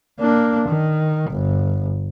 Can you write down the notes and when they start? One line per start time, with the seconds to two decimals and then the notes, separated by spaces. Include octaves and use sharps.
0.20 A#3 D4
0.69 D#3
1.31 G1